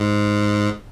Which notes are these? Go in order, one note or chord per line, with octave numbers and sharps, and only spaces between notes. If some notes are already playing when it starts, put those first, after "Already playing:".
Already playing: G#2